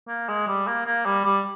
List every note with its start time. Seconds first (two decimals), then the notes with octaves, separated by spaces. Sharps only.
0.08 A#3
0.29 G#3
0.47 G3
0.67 A#3
0.86 A#3
1.05 G3
1.25 G3